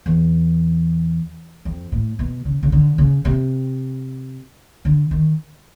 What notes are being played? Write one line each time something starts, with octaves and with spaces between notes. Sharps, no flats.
E2
F2
A2
B2
C#3
C#3
D3
C#3
C3
D3
D#3